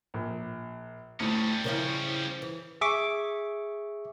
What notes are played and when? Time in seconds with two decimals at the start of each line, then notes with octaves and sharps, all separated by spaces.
0.14 A#1
1.20 D2 A2 G3 C#4
1.64 C#3 F3 E4 A#4 C#5
2.42 E3
2.81 G#4 E5 C#6 D6